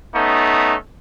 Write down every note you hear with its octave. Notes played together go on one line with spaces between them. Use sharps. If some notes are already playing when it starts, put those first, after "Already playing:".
A3 B3 C#4 D#4